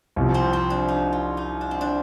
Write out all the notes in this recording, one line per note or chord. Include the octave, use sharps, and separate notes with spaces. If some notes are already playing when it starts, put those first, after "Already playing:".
C2 C3 F3
C4
C4
D4
D#4
F4
D#4
D4
C4
D4